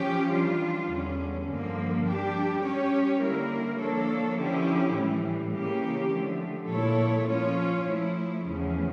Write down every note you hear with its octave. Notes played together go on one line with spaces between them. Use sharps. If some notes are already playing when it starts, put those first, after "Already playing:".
Already playing: F3 C#4 G4 C#5
E3 G3 D4 F4
E2 D3 G3 C#4
G2 D3 F3 A#3
G3 D4 G4
G3 C#4 G4 C#5
D3 G3 A#3 E4 A#4
F3 A#3 D4 A4 C#5
D3 F3 C#4 E4 G4
A2 E3 G3
C#3 E3 A#3 C#4 G4
D3 F3 A3
A#2 A3 E4 A4 C#5
F3 C#4 F4 C#5
F3 A3 E4
E2 C#3 F3 A3 C#4